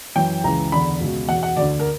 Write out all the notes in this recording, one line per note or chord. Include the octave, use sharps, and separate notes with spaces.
F#2 E3 G5
C#2 C#3 E3 A#5
E2 D3 B5
C#2 B2
E2 B2 F#5
F#5
D2 D5
D3
A#4